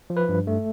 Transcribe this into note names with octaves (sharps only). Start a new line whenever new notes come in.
F3
B4
G2
A3